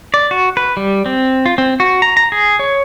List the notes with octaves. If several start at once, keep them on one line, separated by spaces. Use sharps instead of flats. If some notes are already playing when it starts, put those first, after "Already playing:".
D5
F#4
B4
G3
C4
F4
C4
F#4
A#5
A#5
G#4
C#5